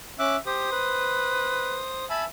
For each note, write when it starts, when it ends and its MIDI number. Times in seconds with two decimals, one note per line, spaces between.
0.19 0.36 61
0.19 0.38 76
0.19 0.36 86
0.19 0.36 90
0.46 0.69 67
0.46 2.05 72
0.46 2.05 87
0.72 1.82 71
2.10 2.26 76
2.10 2.24 80
2.10 2.24 81
2.10 2.24 83